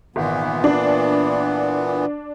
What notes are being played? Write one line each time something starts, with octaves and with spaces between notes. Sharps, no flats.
G#1 A#2 E3 B3
D4